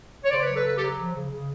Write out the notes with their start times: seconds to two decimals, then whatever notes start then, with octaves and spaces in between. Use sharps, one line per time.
0.24 C#5
0.31 C#3 C5 D5
0.42 B4 C#5
0.47 F#3
0.54 A4 B4
0.64 C#3 A4 B4
0.75 G4 A4
0.81 F#3
0.98 F3
1.14 C#3
1.30 C#3